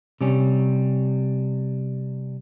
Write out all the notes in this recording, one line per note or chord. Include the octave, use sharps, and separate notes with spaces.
C3 G3 C#4